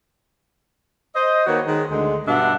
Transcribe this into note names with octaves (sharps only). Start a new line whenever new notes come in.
C5 D#5
D#3 A#3 F#4 B4 C#5
D#3 G#3
D2 D3 G#3
G2 B2 D4 E5 F#5